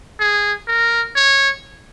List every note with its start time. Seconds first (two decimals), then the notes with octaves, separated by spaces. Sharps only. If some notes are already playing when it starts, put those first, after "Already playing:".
0.20 G#4
0.68 A#4
1.16 C#5